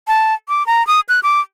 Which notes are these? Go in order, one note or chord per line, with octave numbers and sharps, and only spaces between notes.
A5
D6
A#5
D#6
F#6
D6